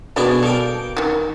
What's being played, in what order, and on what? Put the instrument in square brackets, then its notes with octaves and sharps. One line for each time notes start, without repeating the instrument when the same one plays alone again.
[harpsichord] B2 D4 G#4 [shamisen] D3 E4
[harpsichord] A#3 G5 [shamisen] A4
[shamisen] D#3 E3